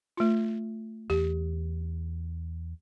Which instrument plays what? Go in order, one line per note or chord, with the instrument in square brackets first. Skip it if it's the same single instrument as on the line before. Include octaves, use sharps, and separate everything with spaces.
[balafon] A3 F4
[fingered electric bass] E2 [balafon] G4